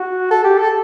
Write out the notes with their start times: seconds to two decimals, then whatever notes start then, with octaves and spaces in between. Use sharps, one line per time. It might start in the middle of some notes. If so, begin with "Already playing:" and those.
Already playing: F#4
0.31 A4
0.44 G4
0.57 A4